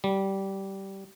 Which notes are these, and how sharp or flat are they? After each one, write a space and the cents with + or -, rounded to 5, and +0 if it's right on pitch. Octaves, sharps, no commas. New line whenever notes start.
G3 -15